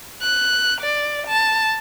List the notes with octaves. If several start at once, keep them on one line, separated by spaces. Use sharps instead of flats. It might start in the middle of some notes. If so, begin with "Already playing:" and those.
F#6
D5
A5